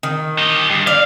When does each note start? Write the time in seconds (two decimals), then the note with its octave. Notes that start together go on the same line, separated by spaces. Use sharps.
0.03 D#3
0.39 G4 D#5
0.70 G2
0.87 D5 F5